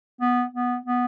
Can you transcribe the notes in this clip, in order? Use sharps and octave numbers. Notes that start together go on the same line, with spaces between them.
B3
B3
B3